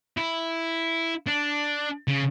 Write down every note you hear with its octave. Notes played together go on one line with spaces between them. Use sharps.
E4
D4
C#3